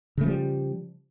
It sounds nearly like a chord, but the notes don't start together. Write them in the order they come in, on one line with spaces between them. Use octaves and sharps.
C#3 A3 F3 G3